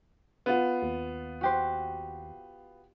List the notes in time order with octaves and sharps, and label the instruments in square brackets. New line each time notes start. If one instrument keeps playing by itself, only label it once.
[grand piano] B3 F4
[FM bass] D#2
[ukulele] F#4 G4 C5